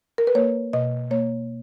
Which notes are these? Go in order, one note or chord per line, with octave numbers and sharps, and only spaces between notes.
A#4
B4
A#3 C#5
B2 D#5
A#3 C#5